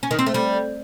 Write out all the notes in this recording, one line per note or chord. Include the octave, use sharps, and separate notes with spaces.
C#4
D#3
C4
A3
G3